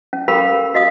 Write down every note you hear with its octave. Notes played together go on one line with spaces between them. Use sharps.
C#4
G4 A4 A#4 F5 G5 B5
F#4 D#5 F5 D#6